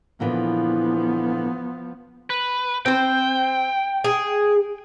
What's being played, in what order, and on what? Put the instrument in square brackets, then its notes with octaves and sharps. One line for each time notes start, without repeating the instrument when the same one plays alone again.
[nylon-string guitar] A#2 D3 E3 [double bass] F3 B3
[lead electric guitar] B4
[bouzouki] C4 C5 [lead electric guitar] G5
[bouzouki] G#4